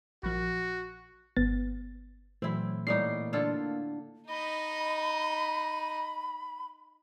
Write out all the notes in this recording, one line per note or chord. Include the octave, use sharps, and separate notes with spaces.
A#1 F3 F#4
G1 B3 A6
A#2 E3 F#3 A3 C4 E4
A2 G3 A#3 D#4 C7
D3 F4 A4
D#4 D#5 B5